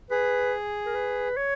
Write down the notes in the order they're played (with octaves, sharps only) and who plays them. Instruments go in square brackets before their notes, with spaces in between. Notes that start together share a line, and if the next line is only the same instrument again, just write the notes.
[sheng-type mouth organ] G#4 [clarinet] B4
[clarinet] A#4
B4
C#5